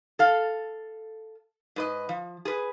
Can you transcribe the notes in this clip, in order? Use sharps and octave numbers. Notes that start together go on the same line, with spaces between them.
A4 F5
G#2 B4 D#5
F3
G#4 B4